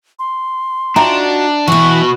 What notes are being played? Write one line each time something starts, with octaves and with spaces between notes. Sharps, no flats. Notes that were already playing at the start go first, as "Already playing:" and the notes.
C6
D4 D#4 F4 F#4 E5 G5 A#5
B2 E3 E4 F#4 C#6